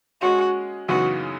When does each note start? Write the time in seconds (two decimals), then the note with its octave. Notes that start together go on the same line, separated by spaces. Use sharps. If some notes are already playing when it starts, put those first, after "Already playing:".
0.22 G#3 C#4 F#4 G#4 D#5
0.89 F#2 C#3 E3 B3 D#4 F#4